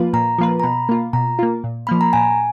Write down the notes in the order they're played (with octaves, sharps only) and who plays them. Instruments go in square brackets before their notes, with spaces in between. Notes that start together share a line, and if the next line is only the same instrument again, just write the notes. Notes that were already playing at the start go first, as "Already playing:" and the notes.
Already playing: [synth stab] F3 A#3 F4 B4
[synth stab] A#2 [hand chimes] A#5
[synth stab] F3 A#3 F4 B4
[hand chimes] A#5
[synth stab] B2 [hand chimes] B5
[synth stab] A#3 F4
[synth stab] B2 [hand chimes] A#5
[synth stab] A#3 F4
A#2
[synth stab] F3 A#3 [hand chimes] B5
[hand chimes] A#5
[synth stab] A#2 [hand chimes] G#5